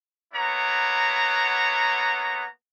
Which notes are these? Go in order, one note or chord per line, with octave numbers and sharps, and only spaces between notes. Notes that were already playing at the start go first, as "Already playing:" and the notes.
A#3 B3 E4 C#5 F#5 A#5